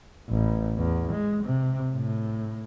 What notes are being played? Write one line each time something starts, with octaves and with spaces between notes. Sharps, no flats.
A1
E2
G#3
C3
A2